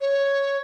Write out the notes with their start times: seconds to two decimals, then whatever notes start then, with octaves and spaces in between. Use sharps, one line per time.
0.01 C#5